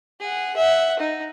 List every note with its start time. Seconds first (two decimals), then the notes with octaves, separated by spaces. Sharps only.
0.20 G#4 F#5
0.57 E5 F#5
0.99 D#4